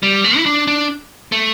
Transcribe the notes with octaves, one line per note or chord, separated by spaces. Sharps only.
G3
A3
E4
D4
D4
A3